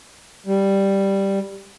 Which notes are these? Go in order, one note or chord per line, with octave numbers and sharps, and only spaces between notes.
G3